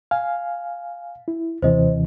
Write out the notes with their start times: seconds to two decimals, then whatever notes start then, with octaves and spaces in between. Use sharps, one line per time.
0.11 F5 G#5
1.28 E4
1.62 D#2 C3 E3 C5 D#5